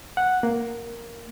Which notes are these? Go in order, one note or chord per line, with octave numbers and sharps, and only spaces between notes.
F#5
A#3